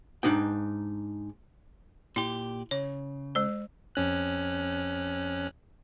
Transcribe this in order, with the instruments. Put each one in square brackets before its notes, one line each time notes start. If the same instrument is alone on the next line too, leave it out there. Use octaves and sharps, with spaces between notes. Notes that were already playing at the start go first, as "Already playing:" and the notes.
[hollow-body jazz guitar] G#2 D4 D#4 G5
[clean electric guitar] A#2 G4 [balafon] E4
[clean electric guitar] C#3 [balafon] C#5
[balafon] G#3 C5
[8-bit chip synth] F2 C#4 F#6